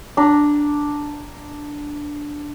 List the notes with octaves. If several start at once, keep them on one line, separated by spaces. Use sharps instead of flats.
D4 A#5